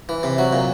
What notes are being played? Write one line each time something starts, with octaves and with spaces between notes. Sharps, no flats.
E3
C3
F#3
A#2